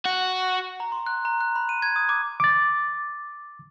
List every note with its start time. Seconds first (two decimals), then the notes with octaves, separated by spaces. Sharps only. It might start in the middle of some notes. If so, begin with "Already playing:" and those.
0.06 F#4
0.80 A#5
0.92 C6
1.06 F#6
1.25 A#5
1.41 F#6
1.56 B5
1.69 D#7
1.82 G#6
1.96 D#6
2.09 D6
2.40 D6 A6